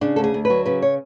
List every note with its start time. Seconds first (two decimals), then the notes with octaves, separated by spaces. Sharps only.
0.01 C#3 D4
0.16 D2 A4
0.24 G#4
0.34 D2
0.45 B4
0.50 F#3
0.66 C#3 B4
0.82 C#5